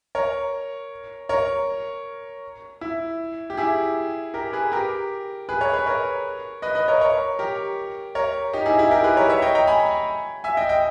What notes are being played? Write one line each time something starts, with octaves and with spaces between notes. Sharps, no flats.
A#4 C#5
A#4 C#5
E4
G4
E4 G#4
G4 A#4
G#4 B4
G4 A#4
G#4 B4
A#4 C#5
G#4 B4
A#4 C#5
B4 D#5
B4 D#5
A#4 C#5
A#4 C#5
G4 A#4
A#4 C#5
D#4 G4
E4 G#4
E4 G#4
G4 A#4
G#4 B4
A#4 C#5
C#5 E5
D#5 G5
G5 A#5
G#5 B5
E5 G#5
D#5 G5
D#5 G5